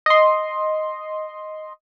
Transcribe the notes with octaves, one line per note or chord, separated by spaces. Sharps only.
D#5 C6